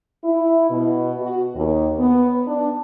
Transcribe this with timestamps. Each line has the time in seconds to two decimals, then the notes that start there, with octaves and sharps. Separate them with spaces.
0.24 E4
0.69 B2
1.20 F#4
1.54 D#2
1.98 B3
2.47 D4